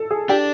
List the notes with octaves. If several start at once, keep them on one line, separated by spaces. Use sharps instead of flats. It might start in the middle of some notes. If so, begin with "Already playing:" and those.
Already playing: A4
G#4
D4 G4